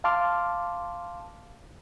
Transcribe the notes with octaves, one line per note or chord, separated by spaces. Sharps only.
F5 A5 C6 D6 F6